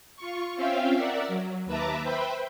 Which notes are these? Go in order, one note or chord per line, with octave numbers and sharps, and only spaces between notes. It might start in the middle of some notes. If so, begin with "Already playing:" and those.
F4 C#6
C4 C#4 F4 E5 F5 G5
A#4 D5 E5 F#5
F#3
D#2 B4 E5 A5 A#5 D6
B4 C5 E5 G5 B5